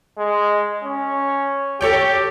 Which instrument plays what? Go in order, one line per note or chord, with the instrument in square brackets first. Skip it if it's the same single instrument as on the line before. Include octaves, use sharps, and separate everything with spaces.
[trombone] G#3
C#4
[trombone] G4 [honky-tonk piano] A4 C#5 G5